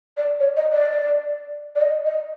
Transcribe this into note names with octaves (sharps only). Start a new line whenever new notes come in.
D5
C#5
D#5
D5
D5
D#5
D#5